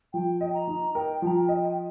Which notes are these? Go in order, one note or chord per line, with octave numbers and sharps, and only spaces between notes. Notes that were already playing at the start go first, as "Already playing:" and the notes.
F3 G5
D#5
A#5
D#4
A#4 G5
F3 A#5
G5
D#5